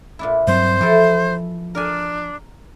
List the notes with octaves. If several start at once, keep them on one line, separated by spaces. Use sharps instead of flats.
A#2 D4 E4
G2 F#3 C4 C5
E3 F3 A4
D4 A#4 G#5